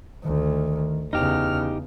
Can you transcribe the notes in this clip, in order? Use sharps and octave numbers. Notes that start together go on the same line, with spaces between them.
D2 D#3
E2 C#3 D#4 G4 F6